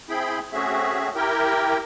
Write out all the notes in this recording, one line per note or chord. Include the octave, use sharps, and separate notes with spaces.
C4 E4 G#4 G5 B5
A3 C4 C#4 F#4 G#4 E5
E4 G4 A#4 G5